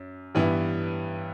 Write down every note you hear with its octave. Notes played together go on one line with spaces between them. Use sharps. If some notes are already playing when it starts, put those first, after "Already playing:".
Already playing: F#2
G2 E3 B3 E4